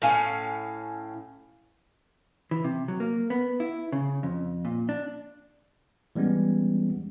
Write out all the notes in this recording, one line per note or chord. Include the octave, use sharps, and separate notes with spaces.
A2 C#4 F5 G#5
E3
C3
F#3
A#3
B3
E4
C#3
F2
A#2
D4
E3 G3 G#3 B3 C#4